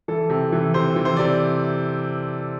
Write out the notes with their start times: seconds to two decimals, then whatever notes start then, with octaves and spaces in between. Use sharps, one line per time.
0.08 E3 A4
0.30 C3
0.52 E3
0.74 C3 C5
0.96 E3
1.05 C5
1.16 C3 D5